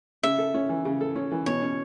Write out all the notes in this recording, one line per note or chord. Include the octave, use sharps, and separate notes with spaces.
C#3 E5
A4
C#4
E3
C#3
A4
C#4
E3
B2 C#5
C#4